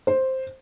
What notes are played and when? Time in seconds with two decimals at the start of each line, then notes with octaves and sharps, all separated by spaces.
0.07 C5